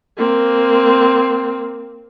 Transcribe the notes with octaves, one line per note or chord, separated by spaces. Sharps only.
A#3 C4